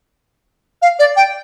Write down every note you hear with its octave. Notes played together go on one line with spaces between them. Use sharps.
F5
D5
G5